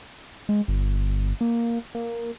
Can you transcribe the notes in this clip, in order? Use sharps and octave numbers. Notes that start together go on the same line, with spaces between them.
G#3
G1
A#3
A#3